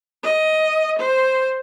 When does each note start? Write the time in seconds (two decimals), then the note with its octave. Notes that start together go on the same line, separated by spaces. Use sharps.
0.23 D#5
0.99 C5